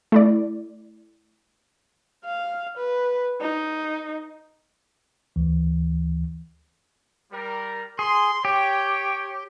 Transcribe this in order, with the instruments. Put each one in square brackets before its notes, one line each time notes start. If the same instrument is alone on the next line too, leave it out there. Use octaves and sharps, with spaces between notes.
[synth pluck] A3 E4 D5
[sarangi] F5
B4
D#4
[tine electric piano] D2 E3
[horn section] G3 A#4
[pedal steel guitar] G#4 [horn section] C6
[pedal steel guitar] G4 [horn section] C#5 G5